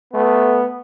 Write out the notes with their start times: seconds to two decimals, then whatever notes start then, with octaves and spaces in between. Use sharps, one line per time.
0.14 A3 B3